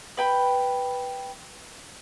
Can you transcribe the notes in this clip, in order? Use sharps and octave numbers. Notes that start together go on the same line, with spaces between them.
B4 G5 B5